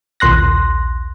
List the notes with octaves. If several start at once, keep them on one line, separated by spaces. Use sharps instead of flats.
A#1 D#2 C6 F#6 A#6